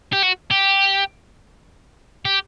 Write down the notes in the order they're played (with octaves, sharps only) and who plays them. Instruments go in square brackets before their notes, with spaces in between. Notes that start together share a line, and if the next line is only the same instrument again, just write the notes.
[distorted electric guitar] G4
F#4
G4
G4